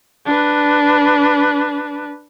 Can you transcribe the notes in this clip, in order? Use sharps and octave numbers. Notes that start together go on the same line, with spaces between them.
D4 B4